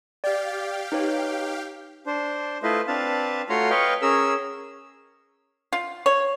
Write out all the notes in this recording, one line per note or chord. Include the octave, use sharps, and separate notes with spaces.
G4 D5 F5 G5
D#4 B4 C#5
D4 C5
A3 E4 F4 B4 C5 D#5
C4 D4 B4 F5 A5
A3 F4 F#4 C#5 A#5 C6
B4 C#5 D#5 F5 G5 C#6
C#4 G#4 A#4 E6
F4
C#5